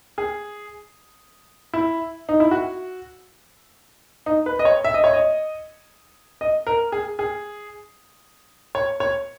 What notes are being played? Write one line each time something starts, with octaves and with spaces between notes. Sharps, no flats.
G#4
E4
D#4
E4
F#4
D#4
B4
D#5
C#5
E5
D#5
C#5
D#5
D#5
A#4
G#4
G#4
C#5
C#5